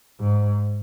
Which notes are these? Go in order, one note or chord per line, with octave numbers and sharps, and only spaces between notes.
G#2